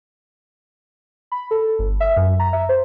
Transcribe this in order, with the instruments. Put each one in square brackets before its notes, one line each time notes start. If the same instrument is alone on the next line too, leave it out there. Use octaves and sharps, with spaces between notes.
[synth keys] B5
A4
G1
E5
F#2
A#5
E5
C5